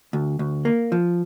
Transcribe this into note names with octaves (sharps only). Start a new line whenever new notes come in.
D2
D2
A#3
F3